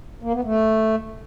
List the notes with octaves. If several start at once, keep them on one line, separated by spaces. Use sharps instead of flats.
A#3
B3
A3